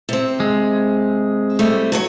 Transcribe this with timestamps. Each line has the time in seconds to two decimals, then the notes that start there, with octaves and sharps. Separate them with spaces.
0.09 C3 C4
0.40 G#3
1.59 C3 G3 A3
1.92 G2 F#3 C#5